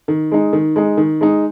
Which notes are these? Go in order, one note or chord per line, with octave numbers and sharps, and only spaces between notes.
D#3
G#3 D#4
D#3
G#3 D#4
D#3
G#3 D#4